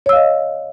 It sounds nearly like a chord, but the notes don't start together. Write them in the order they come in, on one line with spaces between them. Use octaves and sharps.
C#5 E6 F5 D#5